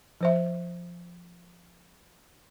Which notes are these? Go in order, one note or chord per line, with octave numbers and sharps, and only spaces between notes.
F3 C5 E5